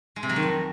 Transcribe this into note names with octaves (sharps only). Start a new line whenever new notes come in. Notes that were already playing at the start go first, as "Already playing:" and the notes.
G#3
C3
F#3
D#3
F2